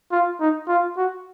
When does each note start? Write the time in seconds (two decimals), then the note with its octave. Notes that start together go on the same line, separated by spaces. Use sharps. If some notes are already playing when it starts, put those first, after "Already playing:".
0.12 F4
0.40 D#4
0.68 F4
0.97 F#4